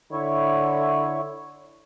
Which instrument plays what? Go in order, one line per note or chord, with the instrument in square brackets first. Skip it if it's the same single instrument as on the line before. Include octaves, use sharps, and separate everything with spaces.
[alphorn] D3 [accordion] E4 C#5